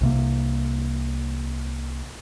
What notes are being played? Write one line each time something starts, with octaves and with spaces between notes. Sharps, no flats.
C2 C3 A#3